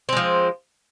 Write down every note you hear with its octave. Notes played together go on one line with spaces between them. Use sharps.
F3 G#3 C4